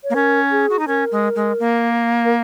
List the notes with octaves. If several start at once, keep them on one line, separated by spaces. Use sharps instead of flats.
C#5
A#3
C#4 A#4
G#4
F#4
D#4
C#4 A#4
G#3
G#3
A#3
A#4